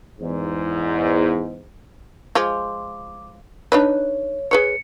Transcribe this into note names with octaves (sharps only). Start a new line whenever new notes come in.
E2 G#2
F3 G#3 F4 D6
D4 D#4 B4 C#5
G#4 B4 C#5 C#7